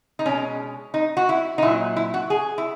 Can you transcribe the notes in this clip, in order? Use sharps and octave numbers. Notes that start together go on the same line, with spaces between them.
D#4
B2 G#3 C#4
D#4
F#4
E4
D#4
A#2 F#3 E4
E4
F#4
G#4
E4